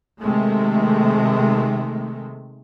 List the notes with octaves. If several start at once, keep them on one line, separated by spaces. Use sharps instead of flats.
C3 D#3 G#3 A3